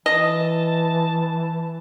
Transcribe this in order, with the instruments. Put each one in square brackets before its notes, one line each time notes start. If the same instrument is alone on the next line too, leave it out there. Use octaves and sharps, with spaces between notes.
[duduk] E3 [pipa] D#5 [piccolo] A5